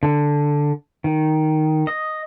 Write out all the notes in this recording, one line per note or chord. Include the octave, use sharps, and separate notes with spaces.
D3
D#3
D#5